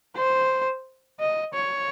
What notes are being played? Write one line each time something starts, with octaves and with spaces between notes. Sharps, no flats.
C5
D#5
C#5